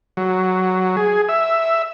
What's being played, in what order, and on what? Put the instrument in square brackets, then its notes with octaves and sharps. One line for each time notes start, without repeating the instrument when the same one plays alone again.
[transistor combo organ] F#3
G#4
E5